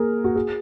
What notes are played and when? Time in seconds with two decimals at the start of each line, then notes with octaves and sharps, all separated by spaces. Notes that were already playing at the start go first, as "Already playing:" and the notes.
Already playing: A#3 G#4 A#4
0.24 F#4
0.36 G#4